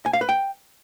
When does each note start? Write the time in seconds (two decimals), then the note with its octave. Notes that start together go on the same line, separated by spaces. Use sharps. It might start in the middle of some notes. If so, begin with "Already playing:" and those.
0.06 G#5
0.13 F5
0.21 B4
0.29 G5